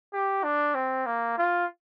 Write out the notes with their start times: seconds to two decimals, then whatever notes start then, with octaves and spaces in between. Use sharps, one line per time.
0.13 G4
0.43 D4
0.75 C4
1.06 A#3
1.38 F4